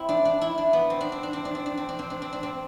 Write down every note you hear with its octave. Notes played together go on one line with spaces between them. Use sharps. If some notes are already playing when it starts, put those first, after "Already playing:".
Already playing: C4 E4
D4
D4
E4
D4
B3
C4
D4
C4
D4
C4
D4
C4
D4
C4
D4
C4
D4
C4
D4
C4